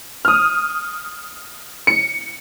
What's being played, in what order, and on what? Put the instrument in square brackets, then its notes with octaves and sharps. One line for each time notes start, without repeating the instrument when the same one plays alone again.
[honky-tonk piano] D#6 F6
C#7